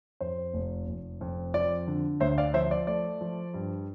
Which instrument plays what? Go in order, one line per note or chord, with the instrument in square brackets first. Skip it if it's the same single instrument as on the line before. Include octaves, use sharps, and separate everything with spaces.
[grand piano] F2 C5
F1
F1
F2
F3 D5
D3
D2 C5 E5
D5 F5
F3 C5 E5
D5
A3 D5
F3
G2